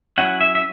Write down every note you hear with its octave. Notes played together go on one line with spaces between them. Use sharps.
F#3 C#4 E4 F#5
E5
E5